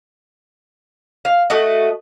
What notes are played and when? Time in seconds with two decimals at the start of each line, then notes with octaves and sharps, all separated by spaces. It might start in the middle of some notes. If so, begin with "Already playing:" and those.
1.25 F5
1.50 A3 F#4 D#5